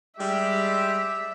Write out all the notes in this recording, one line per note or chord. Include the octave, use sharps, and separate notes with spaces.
G3 G#3 G4 E5